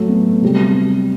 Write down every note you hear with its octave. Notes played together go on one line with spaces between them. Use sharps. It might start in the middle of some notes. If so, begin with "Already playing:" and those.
Already playing: A2 F#3 A3
B3
C3 G3